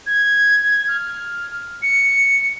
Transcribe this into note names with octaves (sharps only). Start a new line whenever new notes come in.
G#6
F6
C#7